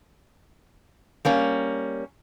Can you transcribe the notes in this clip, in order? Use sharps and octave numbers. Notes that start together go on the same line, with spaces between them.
G3 A#3 C#4